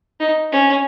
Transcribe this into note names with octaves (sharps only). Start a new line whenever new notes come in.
D#4
C#4